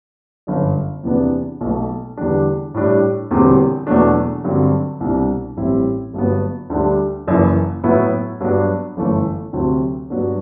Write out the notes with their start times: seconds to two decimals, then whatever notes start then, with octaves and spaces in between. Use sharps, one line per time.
0.47 G1 F#2 D3
1.04 E2 C3 E3 B3 D4
1.61 B1 B2 A3
2.17 E2 D3 G3 D4
2.74 A2 G3 D4
3.31 E1 E2 D3 G3 C4
3.87 E2 B2 F#3 A3 D4
4.44 G2 D3 F#3 C4
5.00 C2 B2 G3 D4
5.57 A1 A2 G3 C4 E4
6.14 G1 G2 F#3 B3
6.70 D2 D3 G3 D4
7.27 F#1 F#2 E3
7.84 A2 F#3 B3 E4
8.40 G2 F#3 B3 D4
8.97 G1 F#2 E3 A3
9.53 D2 C3 F#3 C4
10.10 G2 F#3 B3 D4